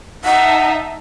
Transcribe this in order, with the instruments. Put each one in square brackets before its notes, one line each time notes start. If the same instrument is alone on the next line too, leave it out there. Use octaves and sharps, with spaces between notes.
[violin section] D#4 E5 A5 [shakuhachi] F#5